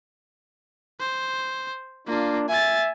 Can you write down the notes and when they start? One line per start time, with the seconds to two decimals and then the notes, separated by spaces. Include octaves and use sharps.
1.00 C5
2.07 A#3 D4 F4
2.49 E5 G#5 A6